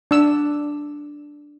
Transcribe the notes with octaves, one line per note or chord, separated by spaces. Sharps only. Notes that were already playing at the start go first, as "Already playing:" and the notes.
D4 E6